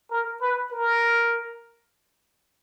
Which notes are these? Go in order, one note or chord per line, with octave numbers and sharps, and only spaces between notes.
A#4
B4
A#4